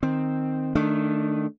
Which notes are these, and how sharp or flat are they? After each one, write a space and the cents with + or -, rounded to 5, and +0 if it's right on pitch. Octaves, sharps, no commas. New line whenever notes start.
D#3 -5 C4 +0
D#3 -15 A3 +0 D4 +0